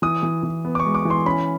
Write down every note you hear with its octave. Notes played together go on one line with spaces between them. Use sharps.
E3 D#6
E3
E3
B3
D6
C#6
G#3
D6
E3
C6
C#4 B5